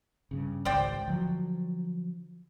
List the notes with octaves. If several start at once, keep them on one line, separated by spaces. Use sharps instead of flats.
G2 C#3
G#1 C#2 C5 D5 G5
D3 F3 F#3